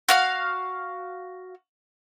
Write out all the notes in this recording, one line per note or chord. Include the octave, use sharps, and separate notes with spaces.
F#4 F5 F6